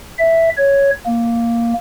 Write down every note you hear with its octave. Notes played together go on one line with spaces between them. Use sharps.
E5
C#5
A#3